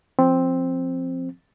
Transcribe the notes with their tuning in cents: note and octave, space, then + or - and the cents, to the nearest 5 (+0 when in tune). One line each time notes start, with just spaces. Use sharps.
F3 +0 C4 +5